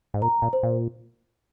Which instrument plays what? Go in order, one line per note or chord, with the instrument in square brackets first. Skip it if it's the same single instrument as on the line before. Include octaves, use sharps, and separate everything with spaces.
[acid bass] G#2
[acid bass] A#2 [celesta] A#5
[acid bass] A#2
[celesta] C5
[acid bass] A#2